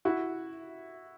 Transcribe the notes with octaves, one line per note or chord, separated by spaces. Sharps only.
E4 F#4